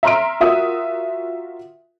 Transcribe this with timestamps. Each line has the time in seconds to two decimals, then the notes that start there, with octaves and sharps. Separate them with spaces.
0.03 E5 A#5 C6 F6 D7
0.40 F4 F#4 A#4 E5 D#6